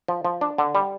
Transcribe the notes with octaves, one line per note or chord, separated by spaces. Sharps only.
F3
F3
D4
D3
G3